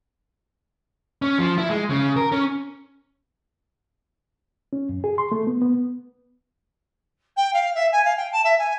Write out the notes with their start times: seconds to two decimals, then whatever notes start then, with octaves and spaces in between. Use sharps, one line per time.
1.22 C#4
1.39 F3
1.58 E4
1.70 G#3
1.90 C#3
2.17 A#4
2.32 C#4
4.73 C#4
4.89 F#2
5.04 G#4
5.18 C6
5.32 A3
5.47 B3
5.62 B3
7.36 G5
7.53 F5
7.75 E5
7.92 G#5
8.04 F5
8.16 G5
8.32 A5
8.44 E5
8.59 G#5